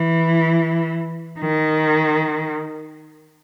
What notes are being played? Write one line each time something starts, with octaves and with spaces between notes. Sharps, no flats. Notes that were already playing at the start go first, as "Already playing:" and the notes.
Already playing: E3
D#3